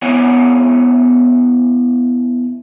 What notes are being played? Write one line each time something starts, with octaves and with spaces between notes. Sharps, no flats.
B2 E3 B3 E4 C#5 F#5